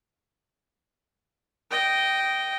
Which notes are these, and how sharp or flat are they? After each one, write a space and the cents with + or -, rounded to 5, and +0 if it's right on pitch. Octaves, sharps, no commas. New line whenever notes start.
D#5 +0 G5 -15